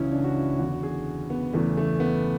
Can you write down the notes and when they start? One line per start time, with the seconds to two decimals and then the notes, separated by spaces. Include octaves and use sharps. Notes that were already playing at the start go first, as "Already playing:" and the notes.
Already playing: C#2 C#3 E3 C#4 E4
0.12 D4
0.24 F#4
0.35 E4
0.59 E2 D3 F#4
0.83 G#4
1.30 B3
1.53 E2 C#3 E3 A3
1.77 A3
2.00 B3